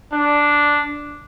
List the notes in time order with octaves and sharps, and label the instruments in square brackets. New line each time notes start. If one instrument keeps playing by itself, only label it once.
[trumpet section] D4